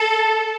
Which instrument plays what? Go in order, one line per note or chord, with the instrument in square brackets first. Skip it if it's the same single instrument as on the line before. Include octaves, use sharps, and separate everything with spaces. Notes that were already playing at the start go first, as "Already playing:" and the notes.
Already playing: [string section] A4